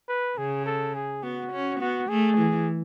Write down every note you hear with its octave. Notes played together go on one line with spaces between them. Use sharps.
B4
C#3 G#4
A4
G#4
B3 F#4
C#4
B3 F#4
A3 G#4
E3